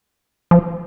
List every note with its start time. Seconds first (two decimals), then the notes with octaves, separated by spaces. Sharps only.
0.51 F3